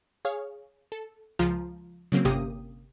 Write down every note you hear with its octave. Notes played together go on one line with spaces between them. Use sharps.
G#4 C#5 F5
A4
C#2 F3 G#3 F4 A#5
C#3 F#3 A#3 C4
G1 C3 A#3 C#4 G4 D#6